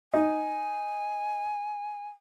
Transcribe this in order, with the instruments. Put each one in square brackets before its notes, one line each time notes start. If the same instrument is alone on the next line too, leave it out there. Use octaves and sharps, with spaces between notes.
[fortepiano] D#4 [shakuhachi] G#5